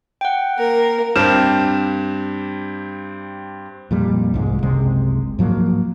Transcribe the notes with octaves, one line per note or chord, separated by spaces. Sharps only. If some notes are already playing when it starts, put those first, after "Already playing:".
F#5 G5
A#3 A#4
G2 C4 G4 A5 F6 E7
F2 A#2 G3
C2 G#2 G#3
F#1 C2 C3 G#3
G#2 F3 F#3 A#3